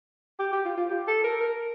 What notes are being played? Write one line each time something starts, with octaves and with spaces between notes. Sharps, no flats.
G4
G4
F4
F4
G4
A4
A#4
A#4